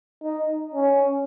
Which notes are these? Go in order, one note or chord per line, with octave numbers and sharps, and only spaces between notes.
D#4
C#4